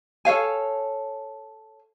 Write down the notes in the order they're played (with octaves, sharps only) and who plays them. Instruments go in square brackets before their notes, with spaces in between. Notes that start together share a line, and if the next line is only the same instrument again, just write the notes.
[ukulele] A4 C#5 F5 G#5